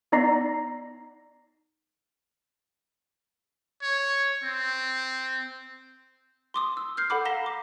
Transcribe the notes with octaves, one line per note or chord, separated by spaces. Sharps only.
B3 D#4 D5 A#5 A#6 C7
C#5
C4
C6 D6 D#6
E6
F6 G6 C7
A4 F#5 B5 D6
F5 A#5 A#6 B6 E7 G7
D6